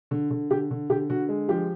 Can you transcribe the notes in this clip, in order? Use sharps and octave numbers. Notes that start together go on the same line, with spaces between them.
D3
D3
D3 G4
D3
D3 G4
D3 F#4
G#3
F3 G4